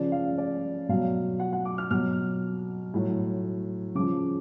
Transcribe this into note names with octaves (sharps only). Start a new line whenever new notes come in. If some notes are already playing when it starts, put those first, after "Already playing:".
Already playing: C#3 F3 D5
F5
D5
B2 F#3 F5
F#5
F#5
D6
F6
B2 F#3 F6
A2 F#3
C#3 F3 D6